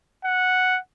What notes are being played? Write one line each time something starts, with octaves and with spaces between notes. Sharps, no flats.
F#5